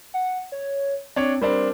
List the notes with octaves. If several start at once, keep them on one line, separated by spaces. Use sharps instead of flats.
F#5
C#5
C4 D4 C#5
G3 C4 D4 A#4